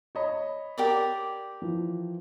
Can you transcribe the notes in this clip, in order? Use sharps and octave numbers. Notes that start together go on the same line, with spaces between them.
C#5 D#5 B5
G4 A#4 D5
E3 F3